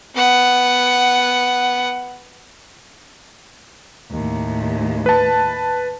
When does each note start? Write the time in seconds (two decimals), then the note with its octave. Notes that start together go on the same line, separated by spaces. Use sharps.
0.15 B3 F#5
4.11 D#2 A2
5.06 B4 A5